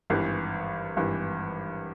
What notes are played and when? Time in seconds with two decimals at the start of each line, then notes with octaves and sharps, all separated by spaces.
0.10 G#1 G2 E3
0.96 G#1 G2 E3